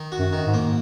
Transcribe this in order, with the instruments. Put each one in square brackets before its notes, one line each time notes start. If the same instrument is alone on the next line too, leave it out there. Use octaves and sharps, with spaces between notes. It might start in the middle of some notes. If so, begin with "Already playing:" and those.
Already playing: [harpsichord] D#3
F#4
[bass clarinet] F#2
[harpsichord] D#3
[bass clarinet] G#2
[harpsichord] A#3